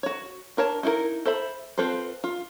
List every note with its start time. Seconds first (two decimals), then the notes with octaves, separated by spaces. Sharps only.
0.03 F#4 C#5
0.57 D4 A#4 C#5 A5
0.83 D#4 E4 F#4 A#4
1.25 A4 C5 E5 B5
1.78 C4 F4 A4 B4 C5
2.24 F4